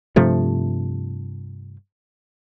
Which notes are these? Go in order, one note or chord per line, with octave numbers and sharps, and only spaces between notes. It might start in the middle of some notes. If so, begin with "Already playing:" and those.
G2 C3 F3 A3